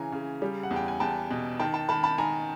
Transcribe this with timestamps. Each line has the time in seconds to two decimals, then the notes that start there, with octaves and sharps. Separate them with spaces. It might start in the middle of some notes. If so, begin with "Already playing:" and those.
Already playing: C#3 E3 C#4 G#5 A#5
0.12 C#3
0.42 G3
0.63 F#5
0.71 E2
0.76 G5
0.88 G#5
1.00 E2 G5 A5
1.31 B2
1.60 D#3 G5 A5
1.74 G5 A5
1.89 D#3 A5 B5
2.03 A5 B5
2.18 D#3 G#5 A#5